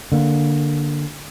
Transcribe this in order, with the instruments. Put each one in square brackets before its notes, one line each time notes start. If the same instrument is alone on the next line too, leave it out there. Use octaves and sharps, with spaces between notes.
[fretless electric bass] D3 A#3